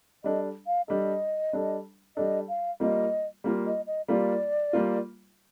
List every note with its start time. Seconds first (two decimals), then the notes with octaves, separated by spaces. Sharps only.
0.24 G3 D4 A4 D#5
0.67 F5
0.88 G3 D4 A4 D#5
1.53 G3 D4 A4
2.17 G3 D4 A4 D#5
2.49 F5
2.80 G3 A#3 F4 D#5
3.44 G3 A#3 F4
3.66 D#5
3.87 D#5
4.08 G3 A#3 F4 D5
4.73 G3 A#3 F4